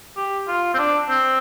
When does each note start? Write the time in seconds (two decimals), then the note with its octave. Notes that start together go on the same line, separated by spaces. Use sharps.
0.17 G4
0.47 F4
0.74 C4
0.78 D4
1.09 C4